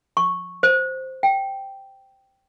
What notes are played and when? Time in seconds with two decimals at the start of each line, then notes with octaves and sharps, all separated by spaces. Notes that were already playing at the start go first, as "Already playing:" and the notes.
0.17 C#6
0.63 C5
1.23 G5